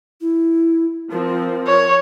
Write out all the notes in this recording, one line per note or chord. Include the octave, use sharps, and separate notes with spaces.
E4
F3 C4 A#4
C#5